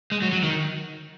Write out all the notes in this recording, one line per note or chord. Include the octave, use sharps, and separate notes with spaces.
G#3
F#3
F#3
D#3